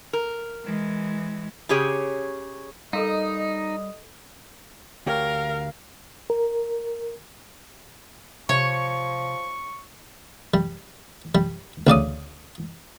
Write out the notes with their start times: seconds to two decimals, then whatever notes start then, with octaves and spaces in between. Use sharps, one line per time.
0.13 A#4
0.64 E3 G#3
1.69 C#3 G4 G#4 C#5
2.93 G3 D#4 A4 A#4 D#5 F5
5.06 D2 G4 A#4 C#5 F5
6.30 A#4
8.49 C3 F3 C#5 C#6
10.54 G3
11.35 G3
11.87 D2 C#3 D5 D#6